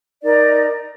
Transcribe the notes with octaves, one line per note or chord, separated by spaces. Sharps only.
D#4 A#4 D5